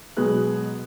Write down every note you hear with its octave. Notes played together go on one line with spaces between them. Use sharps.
B2 F#3 G#3 B3 G#4 F#6